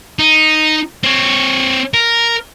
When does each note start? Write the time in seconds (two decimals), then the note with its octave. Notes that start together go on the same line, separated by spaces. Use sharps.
0.19 D#4
1.03 C4 C#5
1.94 A#4